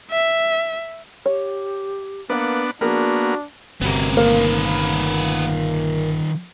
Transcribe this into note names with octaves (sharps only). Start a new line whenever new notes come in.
E5
G4 C#5
A#3 B3 D4 B4 F#5
F3 A#3 B3 D4 F#4 G#4 A#4
G1 C3 B3 C4 F#4 A#4
D#3 A#3 F4